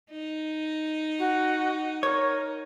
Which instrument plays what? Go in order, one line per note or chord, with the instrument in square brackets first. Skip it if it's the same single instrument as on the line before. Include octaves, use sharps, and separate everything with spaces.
[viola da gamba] D#4
[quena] F#4
[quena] A#4 [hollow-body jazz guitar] C#5